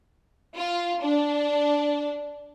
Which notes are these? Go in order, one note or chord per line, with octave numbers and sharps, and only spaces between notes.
F4
D4